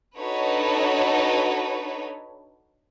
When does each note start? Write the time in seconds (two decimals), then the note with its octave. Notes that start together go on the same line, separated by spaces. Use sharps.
0.17 D4 D#4 F#4 A4 B4 C#5